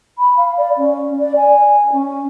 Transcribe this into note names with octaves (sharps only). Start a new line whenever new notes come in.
B5
F5
D5
C#4
D5
G#5
C#4